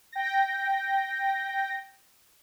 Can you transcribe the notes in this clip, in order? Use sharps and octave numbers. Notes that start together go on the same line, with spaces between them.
G5 A#6